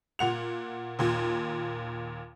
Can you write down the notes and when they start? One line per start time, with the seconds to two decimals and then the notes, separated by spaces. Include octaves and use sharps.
0.19 A#2 F#5 F7
0.99 D#2 A#2